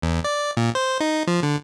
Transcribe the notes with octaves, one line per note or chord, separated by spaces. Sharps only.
E2
D5
A#2
C5
D#4
F3
D3